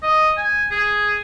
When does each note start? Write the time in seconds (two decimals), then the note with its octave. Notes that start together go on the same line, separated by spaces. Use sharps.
0.03 D#5
0.37 G#5
0.71 G#4